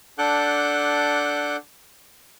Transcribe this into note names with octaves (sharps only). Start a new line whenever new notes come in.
D4 A4 F#5 D6 F#6 G6